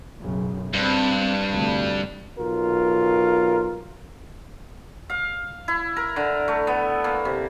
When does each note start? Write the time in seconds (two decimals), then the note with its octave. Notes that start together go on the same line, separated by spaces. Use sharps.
0.20 B1 F#2 C#3
0.73 G2 C4
1.51 F1 D2
2.37 B1 F4 A#4
5.10 F5
5.68 E4
5.96 A#4
6.16 D3
6.48 A3
6.67 B3
7.04 A#3
7.25 C3